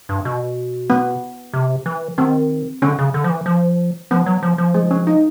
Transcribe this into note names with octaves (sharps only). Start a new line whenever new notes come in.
G2
B2
B3
C3
E3
D#3 C4
D3 C#4
C#3
D3
F3
E3
F3
F3 B3
F#3
F3
F3
G#3
C#4
D#4